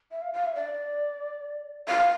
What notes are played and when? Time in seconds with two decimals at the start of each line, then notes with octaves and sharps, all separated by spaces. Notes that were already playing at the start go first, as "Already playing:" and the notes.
0.11 E5
0.22 F5
0.33 F5
0.45 E5
0.55 D5
1.88 F5